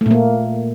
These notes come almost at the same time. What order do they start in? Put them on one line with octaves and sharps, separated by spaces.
A3 A#2 A#3